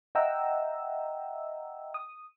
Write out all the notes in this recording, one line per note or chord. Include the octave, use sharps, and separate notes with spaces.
D#5 E5 F#5 G5 A#5 E6
D#6